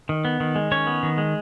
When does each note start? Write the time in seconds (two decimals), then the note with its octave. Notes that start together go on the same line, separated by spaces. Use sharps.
0.09 D#3
0.25 B3
0.40 D#3
0.55 G#3
0.71 D#3 C#4 C#5
0.87 B3
1.03 D#3
1.18 G#3